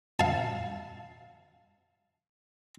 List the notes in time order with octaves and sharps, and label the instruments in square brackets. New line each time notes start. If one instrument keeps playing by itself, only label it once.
[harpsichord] F5 A5